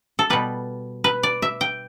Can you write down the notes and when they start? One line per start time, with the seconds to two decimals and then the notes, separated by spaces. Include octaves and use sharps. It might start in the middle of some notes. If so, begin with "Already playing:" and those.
0.19 A4
0.30 B2 G3 B4
1.04 B4
1.23 D5
1.42 E5
1.61 G5